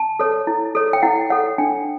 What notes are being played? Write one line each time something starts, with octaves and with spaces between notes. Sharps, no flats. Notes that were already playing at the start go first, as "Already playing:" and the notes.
Already playing: A5
A4 C#5
E4
A4 C#5
G5
E4 F#5
A4 C#5 F#5
D4 G5